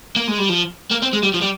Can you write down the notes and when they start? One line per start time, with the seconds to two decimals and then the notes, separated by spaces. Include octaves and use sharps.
0.16 A#3
0.28 G#3
0.39 G3
0.50 F3
0.91 A#3
1.03 C4
1.13 G#3
1.23 G3
1.34 F3
1.42 G3